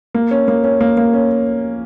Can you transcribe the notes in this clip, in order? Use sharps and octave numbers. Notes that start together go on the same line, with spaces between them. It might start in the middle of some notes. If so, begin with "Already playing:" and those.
A#3
C#4
A#3
C#4
A#3
A#3
C#4